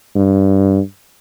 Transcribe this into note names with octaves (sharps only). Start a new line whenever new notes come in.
G2